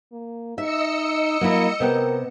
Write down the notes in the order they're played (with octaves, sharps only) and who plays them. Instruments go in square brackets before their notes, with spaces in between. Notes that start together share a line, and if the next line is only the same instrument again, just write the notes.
[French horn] A#3
[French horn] D#4 [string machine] D#5 E6 C#7 [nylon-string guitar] E5
[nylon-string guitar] F#3 E4 [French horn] A#3
[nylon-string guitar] C3 B3 G5 [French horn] A#4